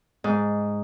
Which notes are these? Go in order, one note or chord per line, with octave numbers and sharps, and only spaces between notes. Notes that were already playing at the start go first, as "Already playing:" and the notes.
G#2